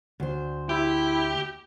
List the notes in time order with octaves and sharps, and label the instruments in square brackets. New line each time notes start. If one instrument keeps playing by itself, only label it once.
[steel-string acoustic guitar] D2 C5
[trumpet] E4 [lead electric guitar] G4